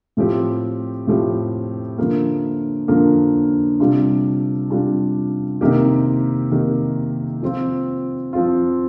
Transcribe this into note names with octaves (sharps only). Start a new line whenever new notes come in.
A2 F3 C4 G4
A2 F3 C4 G4
D3 F3 A#3
D3 F3 A#3
C3 G3 D4 F4
C3 G3 D4 F4
C3 D#3 A#3 D#4 G4
C3 D#3 A#3 D#4 G4
F3 C4 F4
F3 C4 F4